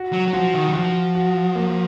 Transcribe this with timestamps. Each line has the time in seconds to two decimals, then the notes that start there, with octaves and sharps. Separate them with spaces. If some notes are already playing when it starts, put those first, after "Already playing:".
Already playing: F#4
0.13 F#3
0.28 F#3
0.33 F3 F#4
0.54 D#3
0.68 F#3
0.75 F3 F#4
1.15 F#4
1.55 A#3